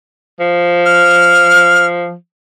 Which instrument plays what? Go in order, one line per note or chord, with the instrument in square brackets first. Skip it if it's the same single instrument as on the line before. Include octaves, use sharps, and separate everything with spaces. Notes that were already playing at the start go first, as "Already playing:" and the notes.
[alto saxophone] F3
[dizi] F6